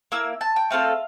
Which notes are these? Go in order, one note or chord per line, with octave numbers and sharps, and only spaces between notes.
A#3 E4 E6
A5
G5
A3 C4 F4 A4 F5